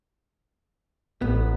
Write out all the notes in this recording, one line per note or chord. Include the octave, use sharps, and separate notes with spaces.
A1 B3